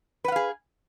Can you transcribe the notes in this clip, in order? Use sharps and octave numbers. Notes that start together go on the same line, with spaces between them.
G#4 B4 F5 F#5